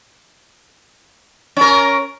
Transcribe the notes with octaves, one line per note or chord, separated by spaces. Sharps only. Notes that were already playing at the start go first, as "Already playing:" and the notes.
C#4 A#4